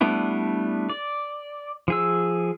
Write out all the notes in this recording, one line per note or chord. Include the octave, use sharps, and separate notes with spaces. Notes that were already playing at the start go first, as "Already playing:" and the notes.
G3 A3 B3 D4 E4
D5
F3 G#4 E6